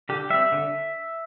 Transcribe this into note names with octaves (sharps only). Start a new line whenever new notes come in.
D3 G4
G3 C4 E5
D3